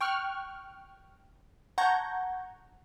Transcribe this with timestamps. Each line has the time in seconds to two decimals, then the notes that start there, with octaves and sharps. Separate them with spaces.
0.01 G5 C#6 F6 F#6
1.78 F#5 A5 A#5 C#6 G6 G#6